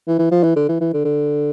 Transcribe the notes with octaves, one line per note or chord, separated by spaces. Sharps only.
E3
E3
F3
E3
D3
E3
E3
D3
D3